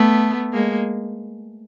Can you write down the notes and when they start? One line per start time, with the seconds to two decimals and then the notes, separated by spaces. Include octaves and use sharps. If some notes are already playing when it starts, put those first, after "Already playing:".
Already playing: A3 B3
0.53 G#3 A#3